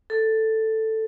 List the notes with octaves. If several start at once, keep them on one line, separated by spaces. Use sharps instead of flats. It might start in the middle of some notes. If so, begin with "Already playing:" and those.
A4